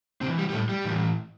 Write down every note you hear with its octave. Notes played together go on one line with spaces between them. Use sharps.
A2 C3 C4
E3
G3
G3
A2 A3
G3
A2 E3